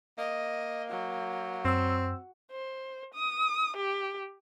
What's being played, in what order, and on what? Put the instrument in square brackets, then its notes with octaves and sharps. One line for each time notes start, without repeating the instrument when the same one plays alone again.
[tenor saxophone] A#3 [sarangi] D#5
[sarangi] F#3
[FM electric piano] F#2 E6 [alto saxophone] C4
[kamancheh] C5
D#6
G4